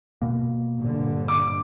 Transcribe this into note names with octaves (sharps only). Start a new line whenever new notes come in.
B2 A#3
G1 A#2 D3
D6